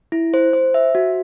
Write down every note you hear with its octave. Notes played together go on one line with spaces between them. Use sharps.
E4
C5
C5
E5
F#4